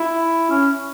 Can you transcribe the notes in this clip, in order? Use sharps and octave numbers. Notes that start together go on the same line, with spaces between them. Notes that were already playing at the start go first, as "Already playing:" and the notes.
Already playing: E4
C#4